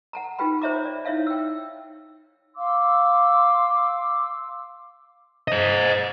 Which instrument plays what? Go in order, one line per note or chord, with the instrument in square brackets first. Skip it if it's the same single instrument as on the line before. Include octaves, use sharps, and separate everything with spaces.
[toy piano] F#5 A5 A#5
D#4 F4 G4 B4 G5 B5
F4 C5 C#5 E5 A#5 D6
D5
D#4 E4 C#5 E5 F5 A5
G5 E6
[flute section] F5 C6 D6 E6
[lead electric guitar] C5 D#5